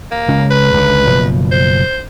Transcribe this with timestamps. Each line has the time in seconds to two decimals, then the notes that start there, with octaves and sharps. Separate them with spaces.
0.12 A#3
0.28 C#3 G#3 C#4
0.51 B4
0.74 C#2 D3
1.07 F#1 B2 F3
1.52 C5